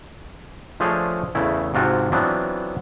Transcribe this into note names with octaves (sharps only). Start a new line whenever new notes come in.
F3 A3 D4 G#4 C5 C#5
E2 C#3 A3 E4
G#2 C3 F4 F#4 G5 A5
E3 F#3 B3 C4 D4 F4